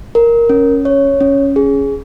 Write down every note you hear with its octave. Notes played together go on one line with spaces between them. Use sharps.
A#4
C#4
C#5
C#4
G#4